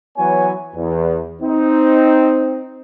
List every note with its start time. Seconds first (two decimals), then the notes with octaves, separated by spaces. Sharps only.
0.16 E3 F#3 B3 C#5 G#5
0.75 E2
1.41 C4 D#4